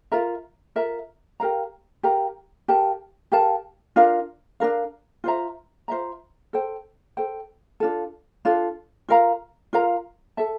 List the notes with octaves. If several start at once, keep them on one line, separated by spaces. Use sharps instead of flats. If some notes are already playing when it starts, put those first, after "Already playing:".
F4 A#4 E5 A#5
F4 A#4 E5 A#5
G4 A#4 F5 A#5
G4 A#4 F5 A#5
G4 A#4 F5 A5
G4 A#4 F5 A5
D4 F4 A#4 F5
D4 F4 A#4 F5
F4 C5 E5 A#5
F4 C5 E5 A#5
A4 C5 G5
A4 C5 G5
D4 F4 A4
D4 F4 A4
F4 A#4 F5 A#5
F4 A#4 F5 A#5
A4 E5 A5